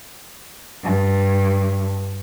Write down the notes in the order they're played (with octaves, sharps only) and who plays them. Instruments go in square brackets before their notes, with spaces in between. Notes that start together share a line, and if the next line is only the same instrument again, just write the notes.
[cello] G2